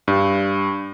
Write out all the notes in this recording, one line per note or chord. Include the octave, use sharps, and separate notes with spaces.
G2